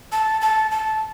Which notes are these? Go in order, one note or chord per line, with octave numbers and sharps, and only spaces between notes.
A5
A5
A5